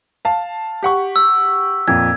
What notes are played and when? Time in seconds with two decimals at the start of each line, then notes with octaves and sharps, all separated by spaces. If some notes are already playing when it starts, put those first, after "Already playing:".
0.25 F5 A5
0.83 G4 F#5 C#6
1.16 E6
1.88 F2 A#2 G#6